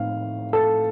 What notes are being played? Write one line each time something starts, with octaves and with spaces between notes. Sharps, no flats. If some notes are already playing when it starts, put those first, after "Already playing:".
Already playing: A2 C4 D#4 F5
A4